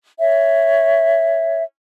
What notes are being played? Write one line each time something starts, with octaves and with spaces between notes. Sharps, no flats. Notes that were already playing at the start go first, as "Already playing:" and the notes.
C#5 E5